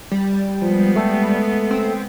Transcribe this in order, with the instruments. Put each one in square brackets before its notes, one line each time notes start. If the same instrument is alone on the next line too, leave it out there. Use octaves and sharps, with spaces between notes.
[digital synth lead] G3
[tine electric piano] F3 [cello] G#3 B3
[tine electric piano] A3 A4
[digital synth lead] C4